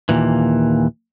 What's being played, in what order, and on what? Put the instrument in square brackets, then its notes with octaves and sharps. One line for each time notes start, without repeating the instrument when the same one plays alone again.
[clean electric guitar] D#2 A#2 E3